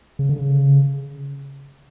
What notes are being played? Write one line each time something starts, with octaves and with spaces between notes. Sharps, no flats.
C#3
D3
C#3